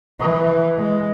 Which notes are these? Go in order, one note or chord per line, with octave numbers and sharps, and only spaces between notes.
E3
G#3